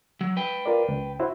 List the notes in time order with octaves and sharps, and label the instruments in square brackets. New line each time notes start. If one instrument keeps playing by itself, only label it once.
[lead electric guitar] F#3
B4 G5
[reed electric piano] F4 A#4 D5
C#2
E4 F#4 C5